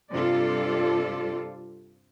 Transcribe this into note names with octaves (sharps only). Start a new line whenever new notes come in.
G2 C3 G3 F4 A4 D5